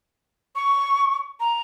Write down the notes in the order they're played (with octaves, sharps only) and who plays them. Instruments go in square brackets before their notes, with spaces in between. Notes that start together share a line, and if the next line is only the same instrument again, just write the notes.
[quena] C#6
A#5